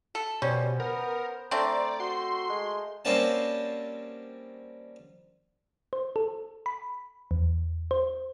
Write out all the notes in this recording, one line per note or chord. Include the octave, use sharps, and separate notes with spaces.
A4
B2 G3 C#4 C5
B3 A#4
A3 C4 D4 C5 D5 A#5
F#4 C6
G#3
G3 A#3 C4 C#4 F#4 A5
C5
A4
B5
E2
C5